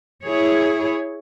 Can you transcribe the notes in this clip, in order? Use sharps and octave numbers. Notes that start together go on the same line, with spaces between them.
E4 G#4 C#5